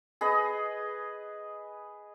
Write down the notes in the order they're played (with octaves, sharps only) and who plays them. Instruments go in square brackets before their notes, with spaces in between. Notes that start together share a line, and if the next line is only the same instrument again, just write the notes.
[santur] G#4 B4 D#5